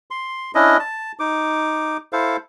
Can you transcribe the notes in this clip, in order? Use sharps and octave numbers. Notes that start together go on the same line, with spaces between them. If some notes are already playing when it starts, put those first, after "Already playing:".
C6
C#4 D4 E4 D#5
A5
D#4 D6
E4 A4 C5 F5